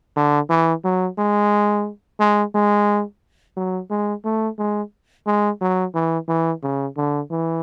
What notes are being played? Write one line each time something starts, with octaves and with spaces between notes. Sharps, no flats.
D3
E3
F#3
G#3
G#3
G#3
F#3
G#3
A3
G#3
G#3
F#3
E3
E3
C#3
D3
E3